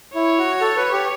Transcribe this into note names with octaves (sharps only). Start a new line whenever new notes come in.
E4 C#5
F#4
A4
B4
G4